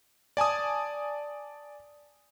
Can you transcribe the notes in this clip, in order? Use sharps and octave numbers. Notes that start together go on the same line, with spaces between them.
D5 G#5 A5 D#6